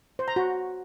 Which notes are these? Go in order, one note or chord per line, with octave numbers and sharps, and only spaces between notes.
C5
A#5
F#4